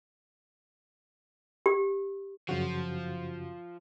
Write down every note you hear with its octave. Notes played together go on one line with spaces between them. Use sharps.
G4
F#2 C#3 F3 F#4